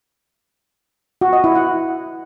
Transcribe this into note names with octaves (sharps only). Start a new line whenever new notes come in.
F#4
D#5
E4
F#5